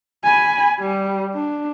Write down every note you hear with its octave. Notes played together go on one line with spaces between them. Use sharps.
G#5 B5
G3
D4